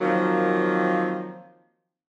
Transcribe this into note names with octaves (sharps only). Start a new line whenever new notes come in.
D#3 F3 F#3 A#3 C4